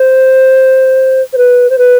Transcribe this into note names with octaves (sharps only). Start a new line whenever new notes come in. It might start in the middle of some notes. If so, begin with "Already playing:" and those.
Already playing: C5
C5
B4
C5
B4